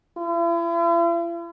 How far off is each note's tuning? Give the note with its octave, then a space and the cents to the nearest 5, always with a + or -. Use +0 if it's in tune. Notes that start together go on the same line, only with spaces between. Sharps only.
E4 +45